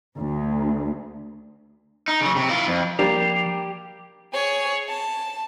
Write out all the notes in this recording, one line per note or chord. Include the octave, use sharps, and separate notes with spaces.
D2
D#4
C#3 F#3
C3
E4 F4
F2
F3 G3 A#3 D4 G4
G#4 C#5
A5